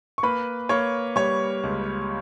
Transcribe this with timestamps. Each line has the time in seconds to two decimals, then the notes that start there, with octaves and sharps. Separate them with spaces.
0.18 C#6
0.23 A#3 B4 B5
0.69 A#3 C#5 C#6
1.16 G3 C#5 C#6
1.63 C#2